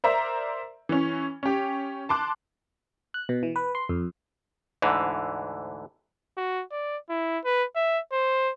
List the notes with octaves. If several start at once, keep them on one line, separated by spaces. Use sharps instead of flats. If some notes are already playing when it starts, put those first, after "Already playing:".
A#4 C5 D5 E5 A#5
E3 C#4
C#4 G4
A5 C6 D6 F#6
F#6
B2
E3
B4
C6
F2
D2 G#2 D3 E3
F#4
D5
E4
B4
E5
C5